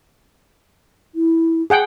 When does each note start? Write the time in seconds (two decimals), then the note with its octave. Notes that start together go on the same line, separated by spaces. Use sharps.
1.15 E4
1.70 G#4 F#5 G5